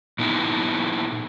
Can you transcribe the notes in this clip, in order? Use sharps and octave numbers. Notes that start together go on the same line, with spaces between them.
A#2 B3 D#4 E4